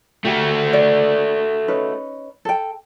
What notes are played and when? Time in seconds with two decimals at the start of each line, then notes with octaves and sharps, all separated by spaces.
0.25 A3 F#4 G4
0.73 D5
1.68 C#4 D#4 B4
2.45 A4 G5